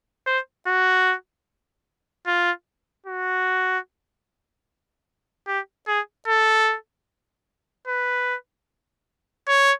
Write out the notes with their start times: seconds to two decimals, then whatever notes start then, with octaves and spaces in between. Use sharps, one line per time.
0.27 C5
0.67 F#4
2.27 F4
3.06 F#4
5.47 G4
5.87 G#4
6.28 A4
7.88 B4
9.48 C#5